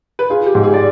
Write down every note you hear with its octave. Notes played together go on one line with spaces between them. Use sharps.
B4
F4 G#4
G4
G#2
G#4
D5